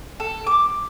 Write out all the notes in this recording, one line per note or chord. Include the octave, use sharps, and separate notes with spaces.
A4
D6